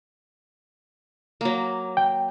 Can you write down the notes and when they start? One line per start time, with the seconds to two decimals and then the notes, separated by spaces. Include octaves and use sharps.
1.41 F#3 A#3
1.97 G5